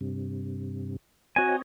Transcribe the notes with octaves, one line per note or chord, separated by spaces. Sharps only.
G2 C3
C4 F#4 C#5 D#5 G#5